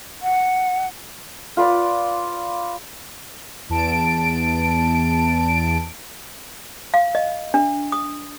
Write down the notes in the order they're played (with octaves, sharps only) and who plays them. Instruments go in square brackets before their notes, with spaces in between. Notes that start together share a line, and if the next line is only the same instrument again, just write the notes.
[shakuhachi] F#5
[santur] F4 B4 D5
[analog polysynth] E2 A5 D7
[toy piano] F5
D#5
D4
D#6